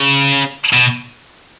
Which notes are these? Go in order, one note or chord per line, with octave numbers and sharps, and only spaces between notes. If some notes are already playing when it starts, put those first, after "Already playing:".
Already playing: C#3
B2